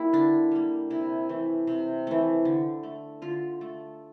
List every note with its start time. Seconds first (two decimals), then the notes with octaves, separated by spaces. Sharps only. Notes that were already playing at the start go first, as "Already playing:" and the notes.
Already playing: G3 A#3 E4
0.13 D3 D4
0.51 G3 A#3
0.90 C3 E4
1.29 E3 A3
1.67 C3
2.07 E3 A3
2.45 D3
2.83 A3
3.22 D3 F4
3.61 A3